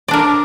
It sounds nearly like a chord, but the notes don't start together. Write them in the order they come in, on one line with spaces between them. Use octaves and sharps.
D5 D4 A#4